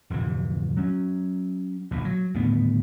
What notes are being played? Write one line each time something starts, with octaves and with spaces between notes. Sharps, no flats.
D1 F2 C3 E3
F#3 C#4
D1 A#1 D#2 B2
F#3
D#1 A2 D3 B3